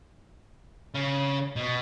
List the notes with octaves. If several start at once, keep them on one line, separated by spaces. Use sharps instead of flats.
C#3
B2